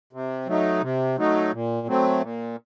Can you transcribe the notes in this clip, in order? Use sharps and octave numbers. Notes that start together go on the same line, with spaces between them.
C3
F#3 A3 D#4
C3
F#3 A3 D#4
A#2
F#3 A3 C4
A#2